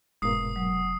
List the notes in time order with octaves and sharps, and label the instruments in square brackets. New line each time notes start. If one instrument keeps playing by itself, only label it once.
[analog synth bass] F1 [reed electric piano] G#2 B2 A#3 [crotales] D#6 C7
[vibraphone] F#3